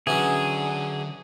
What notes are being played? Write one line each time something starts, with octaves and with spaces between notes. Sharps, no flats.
D3 E3 F#3 C#4 G#4